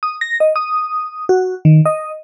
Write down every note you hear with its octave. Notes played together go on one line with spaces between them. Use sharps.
D#6
A#6
D#5
D#6
F#4
D#3
D#5